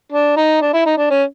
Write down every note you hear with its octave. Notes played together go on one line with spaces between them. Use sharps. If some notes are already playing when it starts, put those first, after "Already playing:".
D4
D#4
D4
E4
D#4
D4
C#4